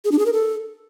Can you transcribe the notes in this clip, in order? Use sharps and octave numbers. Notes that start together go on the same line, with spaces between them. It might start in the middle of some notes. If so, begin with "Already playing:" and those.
G#4
D4
G#4
A#4
A4